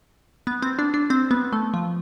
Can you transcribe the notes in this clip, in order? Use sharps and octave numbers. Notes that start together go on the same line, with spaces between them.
B3
C4
D4
D4
C4
B3
A3
F3